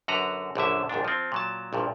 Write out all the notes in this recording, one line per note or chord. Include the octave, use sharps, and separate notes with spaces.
F#2 D3 F#4 B4 A#5
A#1 F#2 D3 E5
A#1 D#2 G#2 D4
F3 C4
A#2 F#3 A5
A#1 G2 A#2